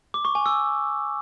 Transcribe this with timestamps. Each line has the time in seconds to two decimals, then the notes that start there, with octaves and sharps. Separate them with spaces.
0.14 D6
0.25 C#6
0.35 G#5
0.46 E6